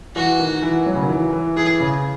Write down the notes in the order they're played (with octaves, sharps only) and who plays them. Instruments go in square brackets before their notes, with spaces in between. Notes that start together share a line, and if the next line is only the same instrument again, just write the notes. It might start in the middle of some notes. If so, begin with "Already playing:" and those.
[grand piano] E3 [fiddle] F#4
[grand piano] D#3
E3
F#3
C#3
D#3
E3
E3
[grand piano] E3 [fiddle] G#4
[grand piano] C#3